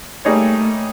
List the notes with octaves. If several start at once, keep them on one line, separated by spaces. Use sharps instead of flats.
G3 A3 A#3 D#4 G#4 C#5